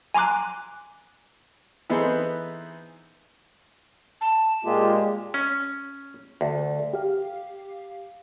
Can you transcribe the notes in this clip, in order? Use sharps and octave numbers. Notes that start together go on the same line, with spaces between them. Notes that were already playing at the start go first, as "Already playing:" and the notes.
G#5 A#5 C6 D6 F#6
E3 B3 D#4 G#4 A4 C5
A5
A#2 G#3 F4 G4
C#4
D2
G4 F5